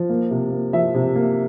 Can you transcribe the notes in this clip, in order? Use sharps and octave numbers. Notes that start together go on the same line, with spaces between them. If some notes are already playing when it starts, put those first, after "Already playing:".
Already playing: F3
A#3
C3
A#3
F3 E5
C3
A#3